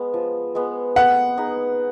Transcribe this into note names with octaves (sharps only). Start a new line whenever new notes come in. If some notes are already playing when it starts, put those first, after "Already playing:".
Already playing: G#3 B3
F3
G#3 B3
B3 F#5
D#4 G#4 B4